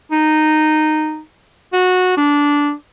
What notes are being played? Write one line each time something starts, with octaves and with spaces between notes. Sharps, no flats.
D#4
F#4
D4